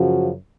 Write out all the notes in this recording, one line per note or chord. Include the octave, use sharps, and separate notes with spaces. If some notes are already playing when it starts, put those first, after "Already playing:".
Already playing: F#2 C#3 F3 F#4